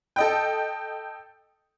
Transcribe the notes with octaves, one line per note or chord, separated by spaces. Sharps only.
A4 D#5 G5